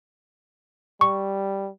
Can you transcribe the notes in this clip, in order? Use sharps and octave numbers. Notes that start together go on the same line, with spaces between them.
G3 C#6